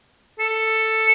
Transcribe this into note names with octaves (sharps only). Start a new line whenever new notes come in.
A4